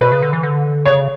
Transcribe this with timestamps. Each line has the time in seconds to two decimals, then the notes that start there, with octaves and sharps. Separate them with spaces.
0.01 B2 B4
0.12 C#3
0.22 D3
0.33 E3
0.43 D3
0.86 C#3 C#5